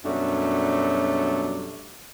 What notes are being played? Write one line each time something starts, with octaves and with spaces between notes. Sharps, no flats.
F#2 B2 F#3 G3 A3 D4